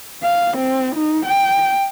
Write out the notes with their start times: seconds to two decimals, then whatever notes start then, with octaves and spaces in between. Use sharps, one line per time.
0.23 F5
0.57 C4
0.95 D#4
1.26 G5